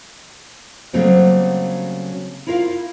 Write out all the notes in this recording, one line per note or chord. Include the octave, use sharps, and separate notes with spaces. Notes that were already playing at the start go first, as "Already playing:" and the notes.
C#3 F#3 G3 A3 A#3 C4
E4 F4 A#4 E5 F5